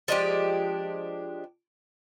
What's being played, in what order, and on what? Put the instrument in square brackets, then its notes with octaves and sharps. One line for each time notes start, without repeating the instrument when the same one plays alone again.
[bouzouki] F3 G#3 D4 G4